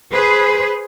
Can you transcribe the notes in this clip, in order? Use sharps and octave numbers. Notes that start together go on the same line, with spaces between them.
G#4 B4 C5